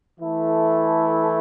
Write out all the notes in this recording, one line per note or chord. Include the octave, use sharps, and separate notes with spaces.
E3 A3 E4 A4